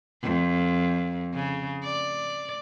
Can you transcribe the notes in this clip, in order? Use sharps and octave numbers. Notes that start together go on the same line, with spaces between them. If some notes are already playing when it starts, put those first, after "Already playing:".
F2
C#3
D5